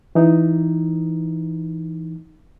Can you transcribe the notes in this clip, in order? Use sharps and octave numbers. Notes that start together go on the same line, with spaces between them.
E3 D#4